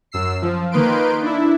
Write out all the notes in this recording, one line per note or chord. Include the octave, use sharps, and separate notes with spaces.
F#2 E6 C7
F3
D#3 A#3 D#4 B4 C6 D7
D4 E4